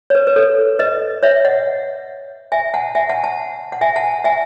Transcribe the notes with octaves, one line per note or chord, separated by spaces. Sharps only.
C#5
B4
B4
A4 C#5
B4 D#5
C#5 E5
D#5 F#5
E5 G#5
F#5 A5
E5 G#5
F#5 A5
F#5 A5
F#5
E5 G#5
F#5 A5
E5 G#5